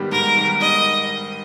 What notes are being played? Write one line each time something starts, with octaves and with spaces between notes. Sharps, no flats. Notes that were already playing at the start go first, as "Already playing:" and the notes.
Already playing: G#2 D#3 G3 B3 G4
G#2 A#4
D#3 G3 B3 G4
G#2 D#5